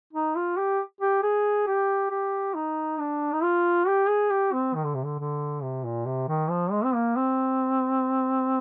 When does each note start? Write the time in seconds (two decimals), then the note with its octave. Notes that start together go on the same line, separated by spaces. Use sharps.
0.13 D#4
0.35 F4
0.57 G4
1.01 G4
1.23 G#4
1.67 G4
2.11 G4
2.54 D#4
2.99 D4
3.32 D#4
3.43 F4
3.87 G4
4.08 G#4
4.31 G4
4.52 C4
4.75 D#3
4.84 D3
4.95 C3
5.05 D3
5.19 D3
5.62 C3
5.84 A#2
6.06 C3
6.28 D#3
6.50 F3
6.72 G#3
6.84 C4
6.94 A#3
7.16 C4